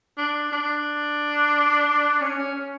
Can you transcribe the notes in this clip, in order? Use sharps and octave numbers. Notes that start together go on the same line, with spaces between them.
D4
D4
C#4
C#4
C#4